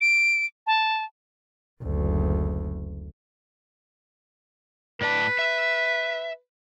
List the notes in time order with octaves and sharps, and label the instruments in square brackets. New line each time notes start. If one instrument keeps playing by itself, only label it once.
[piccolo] D7
A5
[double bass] F#1 D2
[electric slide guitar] A2 D5 A5 [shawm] B4
[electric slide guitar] E5